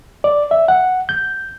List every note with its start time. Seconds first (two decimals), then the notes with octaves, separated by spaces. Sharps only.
0.24 D5
0.51 E5
0.68 F#5
1.09 G6